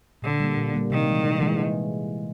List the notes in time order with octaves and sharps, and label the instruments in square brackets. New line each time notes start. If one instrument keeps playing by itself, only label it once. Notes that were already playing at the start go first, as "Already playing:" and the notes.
[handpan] A#2 [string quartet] D3
[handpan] G3 A#3
A#2
G3 A#3
[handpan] C3 [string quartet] D#3
[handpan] E3 G#3
C3
E3 G#3